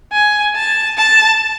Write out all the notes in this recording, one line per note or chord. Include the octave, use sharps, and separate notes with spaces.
G#5
A5
A5